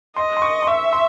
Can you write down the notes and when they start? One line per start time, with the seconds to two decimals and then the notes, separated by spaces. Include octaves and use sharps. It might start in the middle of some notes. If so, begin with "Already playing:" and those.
0.16 D#5 C6
0.37 C6
0.42 C#6
0.62 C6
0.67 E5 C#6
0.93 C6